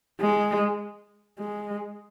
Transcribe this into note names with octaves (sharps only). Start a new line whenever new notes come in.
G#3
G#3